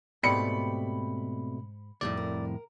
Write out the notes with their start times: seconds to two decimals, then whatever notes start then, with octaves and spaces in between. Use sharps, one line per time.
0.23 G#2 B2 A3 C4 G4 D5 B5 C#7
2.01 C2 F2 A2 D#4 D5
2.17 A#4